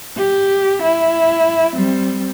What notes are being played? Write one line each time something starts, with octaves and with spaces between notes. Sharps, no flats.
G4
E4
G3 C4